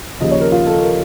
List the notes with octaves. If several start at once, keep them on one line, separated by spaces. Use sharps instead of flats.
D#2 C#3 F3 D#5
C#5
A#4
F4
A4
A#4